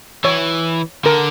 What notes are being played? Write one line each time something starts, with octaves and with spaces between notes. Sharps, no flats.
E3 C#5
D3 A#4